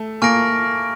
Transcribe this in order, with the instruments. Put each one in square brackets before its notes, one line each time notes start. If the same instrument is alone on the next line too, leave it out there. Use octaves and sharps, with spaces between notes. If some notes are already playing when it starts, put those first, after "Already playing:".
Already playing: [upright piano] A3
[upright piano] A#3 [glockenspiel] G#5 C#6 F6 A#6 D7